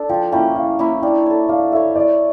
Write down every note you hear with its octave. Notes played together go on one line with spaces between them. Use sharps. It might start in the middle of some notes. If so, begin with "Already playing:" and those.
Already playing: D4 A4
F3 G5
A#3 C#4 E4 G5
F3 F5
A#3 C#4 E4
D4 G5
A4 C#5
D4 F5
A4 C#5 E5
E4 D5